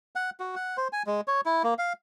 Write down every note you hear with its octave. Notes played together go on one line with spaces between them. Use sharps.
F#5
F#4
F#5
C5
G#5
G#3
C#5
E4
A#3
F5